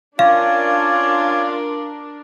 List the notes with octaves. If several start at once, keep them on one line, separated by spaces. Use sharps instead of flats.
C#4 D4 F4 A#4 C#5 D5 F5